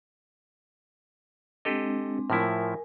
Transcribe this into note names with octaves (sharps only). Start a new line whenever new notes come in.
G#3 C4 D4 G4 A4 D#5
A2 F3 E4 A#4 G#5